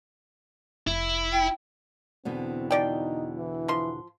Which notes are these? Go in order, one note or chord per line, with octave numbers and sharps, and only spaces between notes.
F1 E4
G5
E2 B2 D3 C4
F3 D#4 D5 G5
E3
F3 C6